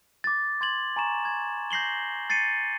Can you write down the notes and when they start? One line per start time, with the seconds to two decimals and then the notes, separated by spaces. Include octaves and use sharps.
0.24 D6 A6
0.61 C6 G#6 A6 F#7
0.96 G#5 A#5 C#6 E7
1.25 G#6
1.71 G6 A#6 C7 F#7 G7
2.30 A6 C7 C#7 D#7